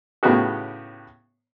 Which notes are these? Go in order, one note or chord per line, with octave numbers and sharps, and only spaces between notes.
A2 C#3 B3 D#4 F#4 G4